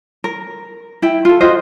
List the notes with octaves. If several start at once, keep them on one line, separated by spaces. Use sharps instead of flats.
A#4
E4 G5
F4 A4
F4 F#4 C5 D#5